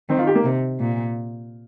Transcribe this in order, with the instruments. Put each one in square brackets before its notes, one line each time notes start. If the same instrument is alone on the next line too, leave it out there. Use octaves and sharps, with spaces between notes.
[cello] D#3 [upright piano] C4
[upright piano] F4
G4
A#3
[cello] C3
A#2